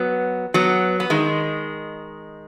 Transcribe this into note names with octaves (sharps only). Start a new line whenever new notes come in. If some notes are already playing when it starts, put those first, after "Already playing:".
Already playing: F#3 B3
F#3 B3
B3
D#3 G#3